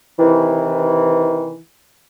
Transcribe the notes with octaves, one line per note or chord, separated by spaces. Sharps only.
C3 D#3 E3